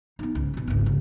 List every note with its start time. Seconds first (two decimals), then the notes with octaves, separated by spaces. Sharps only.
0.19 B3 D#4
0.35 C#2 G#2
0.54 B2 D#3
0.68 G#1 C#2
0.86 C#2